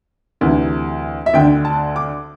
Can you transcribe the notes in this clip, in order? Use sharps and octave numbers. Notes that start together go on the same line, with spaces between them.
D2 C3 E3
E5
D2 D3 G5
A5
D6